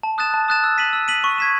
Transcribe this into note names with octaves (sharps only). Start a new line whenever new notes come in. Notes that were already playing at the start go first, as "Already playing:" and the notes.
A5
D#6 F#6 A6 E7
A5
D#6 F#6 A6 E7
E6
B6 D#7 F#7
E6
B6 D#7 F#7
C#6
G#6 B6 E7